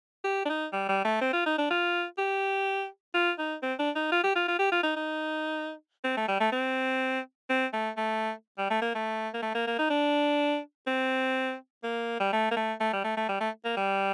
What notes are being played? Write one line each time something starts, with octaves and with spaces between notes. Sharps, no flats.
G4
D4
D#4
G3
G3
A3
C4
F4
D#4
D4
F4
G4
F4
D#4
C4
D4
D#4
F4
G4
F4
F4
G4
F4
D#4
D#4
C4
A3
G3
A3
C4
C4
A3
A3
G3
A3
A#3
A3
A#3
A3
A#3
A#3
D#4
D4
C4
A#3
G3
A3
A#3
A3
A3
G3
A3
A3
G3
A3
A#3
G3